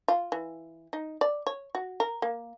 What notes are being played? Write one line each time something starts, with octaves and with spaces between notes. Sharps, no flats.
F4
E3
D#4
D5
C#5
F#4
A#4
A#3